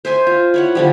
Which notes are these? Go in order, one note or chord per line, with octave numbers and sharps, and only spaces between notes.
C5 E5 G#5 C6
F4
E4 C#5 F#5
D3 F3 G3